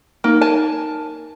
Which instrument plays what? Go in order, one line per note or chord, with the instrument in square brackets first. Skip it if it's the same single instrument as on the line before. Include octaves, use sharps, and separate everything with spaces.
[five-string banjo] A#3 [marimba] D#4 A#4
[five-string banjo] G#5 A5